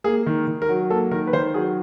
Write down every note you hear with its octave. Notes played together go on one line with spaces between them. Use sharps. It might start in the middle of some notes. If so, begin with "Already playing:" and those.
A#3 G#4
D#3
D#3
A#4
F#3
A#3 A4
D#3 A#4
B4
D#3 C5
F#3 G#4